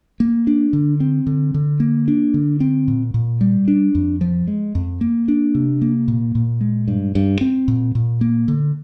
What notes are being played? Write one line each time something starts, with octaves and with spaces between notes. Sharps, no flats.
A#3
D4
D3
C4
D3
D3
A#3
D4
D3
C4
A#2
A#2
G3
D4
F2
F3
G#3
F2
A#3
D4
C3
A#3
A#2
A#2
G#3
G2
G2
C4
A#2
A#2
A#3
D3